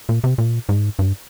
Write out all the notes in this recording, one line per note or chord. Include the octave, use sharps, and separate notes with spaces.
A#2
C3
A#2
G#2
G2